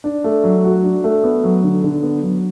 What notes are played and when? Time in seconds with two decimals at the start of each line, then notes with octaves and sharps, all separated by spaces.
0.04 D4
0.24 A3
0.44 F#3
0.64 F#4
0.84 D4
1.04 A3
1.24 B3
1.44 F#3
1.64 D3
1.84 D3
2.03 B3
2.23 F#3